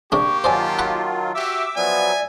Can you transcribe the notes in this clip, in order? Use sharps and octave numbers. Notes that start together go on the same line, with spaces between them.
C3 G3 A#3 D4 G4 C#6
D#3 F#3 F4 C5 D5 G#5 A5
F#5 B5 C#6
F#4 G4 E5 D6 E6
F3 F#3 B3 D5 E5 G#5